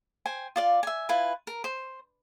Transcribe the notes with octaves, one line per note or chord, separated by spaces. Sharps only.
C5 G5 G#5
F4 D5 F5
E5 G#5
E4 F4 B4 G#5
A#4
C5